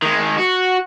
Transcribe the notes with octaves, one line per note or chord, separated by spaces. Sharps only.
D#3 G#3
F#4